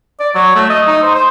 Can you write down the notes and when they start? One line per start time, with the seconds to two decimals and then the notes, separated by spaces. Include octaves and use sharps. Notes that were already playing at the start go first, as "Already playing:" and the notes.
0.20 D5
0.35 F#3
0.56 A3
0.70 D#5
0.87 D#4
1.03 C5
1.15 C5